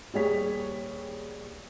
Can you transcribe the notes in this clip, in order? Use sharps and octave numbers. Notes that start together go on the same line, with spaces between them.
D#1 G3 G#4 C#5 B6